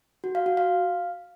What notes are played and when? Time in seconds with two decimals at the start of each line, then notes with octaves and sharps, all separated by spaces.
0.24 F#4
0.35 F5
0.46 F#4
0.57 F5